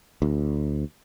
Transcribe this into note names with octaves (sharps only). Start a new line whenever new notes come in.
D2